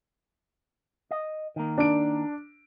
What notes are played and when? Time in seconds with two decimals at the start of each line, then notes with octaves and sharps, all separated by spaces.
1.11 D#5
1.56 D#3 A#3
1.78 D4 D7